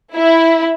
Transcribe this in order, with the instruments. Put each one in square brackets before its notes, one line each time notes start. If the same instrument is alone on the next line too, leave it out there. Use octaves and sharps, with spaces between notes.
[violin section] E4